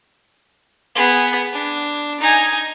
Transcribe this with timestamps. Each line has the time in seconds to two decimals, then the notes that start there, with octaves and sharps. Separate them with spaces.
0.95 B3 G#4
1.53 D4
2.20 D#4 G#5